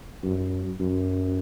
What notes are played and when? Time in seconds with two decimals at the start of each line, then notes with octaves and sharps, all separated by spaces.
0.23 F#2
0.80 F#2